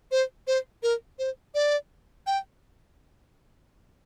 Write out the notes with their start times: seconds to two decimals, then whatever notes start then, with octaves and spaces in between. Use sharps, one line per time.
0.11 C5
0.47 C5
0.83 A#4
1.19 C5
1.55 D5
2.27 G5